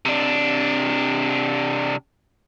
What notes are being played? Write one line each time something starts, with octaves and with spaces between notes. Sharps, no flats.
C3 D4